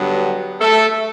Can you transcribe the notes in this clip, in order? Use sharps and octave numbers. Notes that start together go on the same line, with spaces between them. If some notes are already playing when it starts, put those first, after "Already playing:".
Already playing: G2 D3 F#3 B3
A3 A4